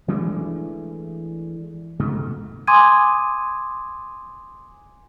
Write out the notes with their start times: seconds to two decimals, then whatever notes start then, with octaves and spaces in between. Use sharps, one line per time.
0.08 E3 G#3 A3 D4
1.99 C#2 G#2 B2 A3
2.67 G#5 C6 D6 D#6 G#6 D#7